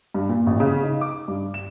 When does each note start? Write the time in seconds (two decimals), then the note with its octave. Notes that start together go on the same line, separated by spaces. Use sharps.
0.14 G2
0.29 A#2
0.47 A1
0.60 C#3
0.83 D#4
1.01 D6
1.28 G2
1.54 E7